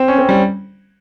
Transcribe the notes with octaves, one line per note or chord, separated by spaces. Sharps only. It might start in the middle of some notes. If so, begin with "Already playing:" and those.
Already playing: C4
C#4
C4
G3